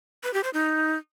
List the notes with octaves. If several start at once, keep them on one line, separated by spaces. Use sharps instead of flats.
B4
G4
C5
D#4